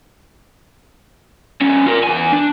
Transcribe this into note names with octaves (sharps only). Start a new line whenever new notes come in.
G3 C#4
F4 A#4
E2 G#5
D4